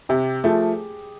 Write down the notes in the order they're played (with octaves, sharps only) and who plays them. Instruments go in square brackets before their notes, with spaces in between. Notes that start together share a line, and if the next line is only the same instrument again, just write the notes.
[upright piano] C3 [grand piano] G4
[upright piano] F3 A3 [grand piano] G#4